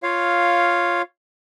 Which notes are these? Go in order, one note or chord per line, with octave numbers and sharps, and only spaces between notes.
F4 C#5 F5